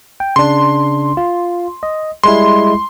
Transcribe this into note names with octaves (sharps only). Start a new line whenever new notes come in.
G5
C#3 D4 C6
F4
D#5
G3 G#3 E4 C6